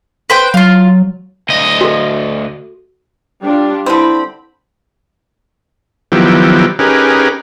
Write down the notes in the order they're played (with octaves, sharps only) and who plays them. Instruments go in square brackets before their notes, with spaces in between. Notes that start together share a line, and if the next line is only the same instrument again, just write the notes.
[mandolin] B4 C5 G5
[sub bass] F#3 [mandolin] F4 F5
[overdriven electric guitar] D2 D#5
[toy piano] F#4 A4
[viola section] G3 D4 F4 [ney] G5
[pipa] D3 G3 C4 [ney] E4 [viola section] B5
[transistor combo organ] D#3 F3 F#3 B3 E4 G4
C#4 D#4 G4 G#4 A#4 B4